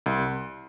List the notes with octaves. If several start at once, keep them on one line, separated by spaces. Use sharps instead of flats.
C2